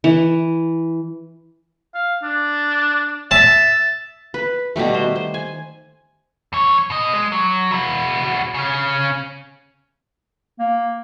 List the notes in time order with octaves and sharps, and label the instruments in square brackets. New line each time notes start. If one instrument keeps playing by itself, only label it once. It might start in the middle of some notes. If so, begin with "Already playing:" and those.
[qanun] E3
[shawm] F5
D4
[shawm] E5 [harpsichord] A5
[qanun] B4
B2 D#3 G3 A3
C5
C5
G#5
[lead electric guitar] F2 C#5
B2 D#5
G#3
F#3
E4 F#4
C#3 C#4
[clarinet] A#3